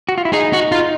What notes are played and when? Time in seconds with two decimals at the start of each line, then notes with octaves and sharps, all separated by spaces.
0.09 F#4
0.18 F4
0.25 E4
0.33 D#4 G#4
0.53 F#4
0.72 F4